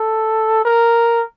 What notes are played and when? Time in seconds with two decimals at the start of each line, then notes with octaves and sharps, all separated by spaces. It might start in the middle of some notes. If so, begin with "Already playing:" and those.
Already playing: A4
0.65 A#4